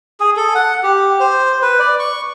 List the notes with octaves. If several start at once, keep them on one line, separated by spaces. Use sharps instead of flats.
G#4
A4
F#5
G4
C5
B4
D5
C#6